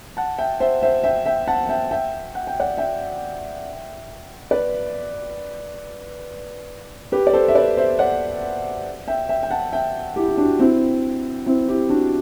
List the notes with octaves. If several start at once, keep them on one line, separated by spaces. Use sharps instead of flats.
F#5 A5
E5 G5
C5 E5
C5 E5
E5 G5
E5 G5
F#5 A5
E5 G5
E5 G5
F#5
G5
D5 F#5
E5 G5
B4 D5
G4 B4
D5
A4 C5
E5
B4 D5
C5 E5
D5 F#5
E5 G5
E5 G5
G5
F#5 A5
E5 G5
E4 G4
E4
D4 F#4
C4 E4
C4 E4
E4 G4
D4 F#4